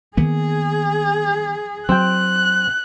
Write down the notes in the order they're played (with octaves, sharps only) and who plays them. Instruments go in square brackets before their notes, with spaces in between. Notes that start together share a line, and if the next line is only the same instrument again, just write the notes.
[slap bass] D#3 A#3 B3 [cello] G#4
[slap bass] F#3 [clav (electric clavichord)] C4 G5 [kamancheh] F#6